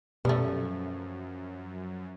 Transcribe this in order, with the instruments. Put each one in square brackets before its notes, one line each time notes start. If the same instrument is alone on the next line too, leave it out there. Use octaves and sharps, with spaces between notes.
[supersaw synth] F#2 [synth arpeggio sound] B2 [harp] F3 C#4 [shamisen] G3 A3